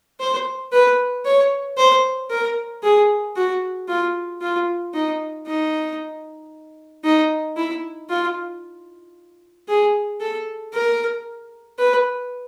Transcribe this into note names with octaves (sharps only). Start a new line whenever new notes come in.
C5
B4
C#5
C5
A#4
G#4
F#4
F4
F4
D#4
D#4
D#4
E4
F4
G#4
A4
A#4
B4